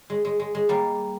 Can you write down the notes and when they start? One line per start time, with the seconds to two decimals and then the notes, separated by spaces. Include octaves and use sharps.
0.10 G#3
0.25 G#3
0.40 G#3
0.55 G#3
0.69 G3 A#3